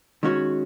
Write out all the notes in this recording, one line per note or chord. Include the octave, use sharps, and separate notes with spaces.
D#3 G#3 C#4 F#4 C#5